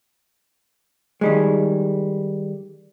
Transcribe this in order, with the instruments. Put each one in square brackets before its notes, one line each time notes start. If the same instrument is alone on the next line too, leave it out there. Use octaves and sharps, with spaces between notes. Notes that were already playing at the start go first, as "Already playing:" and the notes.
[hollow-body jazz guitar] D#3 G3 G#3